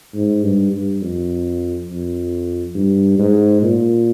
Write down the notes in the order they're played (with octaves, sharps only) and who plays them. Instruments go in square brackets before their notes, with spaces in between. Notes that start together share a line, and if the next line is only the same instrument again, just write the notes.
[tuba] G#2
G2
G2
F2
F2
G2
G#2
A#2